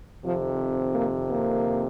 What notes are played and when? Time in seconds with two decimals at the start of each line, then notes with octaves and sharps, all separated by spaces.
0.22 F2 C3 D#3 F3
0.94 A#3
1.29 A#3